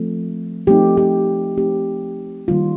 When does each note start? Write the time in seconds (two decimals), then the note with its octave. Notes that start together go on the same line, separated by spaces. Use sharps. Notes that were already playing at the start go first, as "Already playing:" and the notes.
Already playing: F3 A3 C4
0.67 F3 A3 C4 D#4 G4
0.97 G4
1.57 F3 A3 C4 D#4 G4
2.48 D#3 G3 A#3 D4 F4